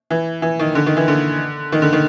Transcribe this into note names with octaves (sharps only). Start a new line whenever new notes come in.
E3
E3
D#3
D3
D#3
E3
D3
D#3
D3
D#3